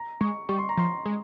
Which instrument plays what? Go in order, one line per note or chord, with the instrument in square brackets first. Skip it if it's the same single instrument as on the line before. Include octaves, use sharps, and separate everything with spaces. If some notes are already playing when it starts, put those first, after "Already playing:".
Already playing: [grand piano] A#5
[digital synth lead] G#3 [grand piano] C#6
[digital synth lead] G3 [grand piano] C#6
[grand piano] C6
A#5
[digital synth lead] F3 [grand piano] C6
[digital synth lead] G#3